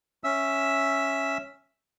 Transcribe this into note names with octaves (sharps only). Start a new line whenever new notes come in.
C#4 E5 E6